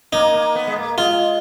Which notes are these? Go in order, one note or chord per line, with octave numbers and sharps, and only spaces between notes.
A#3 D#4
A#3
B3
G#3
A#3
G#3 F4